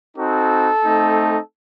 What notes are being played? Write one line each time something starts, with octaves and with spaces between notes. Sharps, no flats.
C4 D#4 F#4 A4
A3 C4 D#4